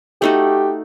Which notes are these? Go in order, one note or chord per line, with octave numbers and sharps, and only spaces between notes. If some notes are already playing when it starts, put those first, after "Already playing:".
A3 D#4 F#4 G4